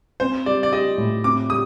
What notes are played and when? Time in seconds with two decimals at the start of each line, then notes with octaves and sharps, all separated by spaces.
0.20 C4 C5
0.46 G3 D5
0.63 D5
0.72 G4 D#5
0.98 A2
1.24 C4 D6
1.50 G3 D#6